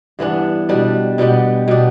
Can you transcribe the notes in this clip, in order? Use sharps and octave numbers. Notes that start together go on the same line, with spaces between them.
G2 E3 B3 D4
B2 G3 D4 G4
B2 G3 B3 G4
B2 B3 D4 G4